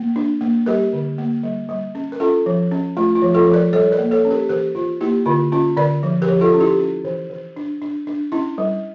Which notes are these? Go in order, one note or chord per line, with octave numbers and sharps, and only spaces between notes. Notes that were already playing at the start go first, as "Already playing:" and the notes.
Already playing: A#3
D4
A#3
G3 G4 A#4
D3
A#3
G3
G3
C#4
A#4
C#4 F4 A4
F3
C#4
A3 F4
F4
F3
F4 A4
F3
A#4 D5
G3 A4 C#5
A#4 D5
A#3
A4 C#5
C#4
G4 A#4
E3 G4 A#4
E3 F4
A#3 E4 G4
D3 F4
C#4 F4
D3 A#4 D5
F3
G4 A#4
F3
F4 A4
C#4
E4 G4
C#4
E3
E3
D4
D4
D4
C#4 E4
G3